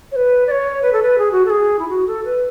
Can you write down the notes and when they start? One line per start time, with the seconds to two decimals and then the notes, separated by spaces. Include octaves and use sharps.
0.12 C#5
0.16 B4
0.47 D5
0.51 C#5
0.82 B4
0.93 A4
1.03 B4
1.18 G#4
1.32 F#4
1.46 A4
1.50 G#4
1.79 E4
1.89 F#4
2.07 A4
2.25 B4